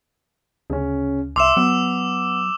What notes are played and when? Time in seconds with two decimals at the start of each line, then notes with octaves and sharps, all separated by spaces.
0.70 D2 C#3 C#4
1.36 C2 E5 C6 D6 E6 E7
1.57 F#3 B3